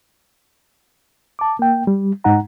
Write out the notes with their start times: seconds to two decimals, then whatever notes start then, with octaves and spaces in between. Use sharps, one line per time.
1.39 A5 D6
1.59 A#3 G5
1.87 G3
2.24 G#2 G#3 D#4 F#5 A#5